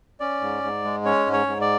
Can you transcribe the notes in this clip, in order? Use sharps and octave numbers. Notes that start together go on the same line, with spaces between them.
C#4 D5
G#2
G#2
G#3
C#4 C#5
G#2
C#5
G#2
D5